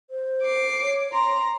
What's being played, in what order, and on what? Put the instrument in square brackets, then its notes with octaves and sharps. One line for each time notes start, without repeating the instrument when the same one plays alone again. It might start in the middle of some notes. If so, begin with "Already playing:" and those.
[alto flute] C5
[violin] D6 C7
[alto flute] C#5
[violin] A#5 [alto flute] C6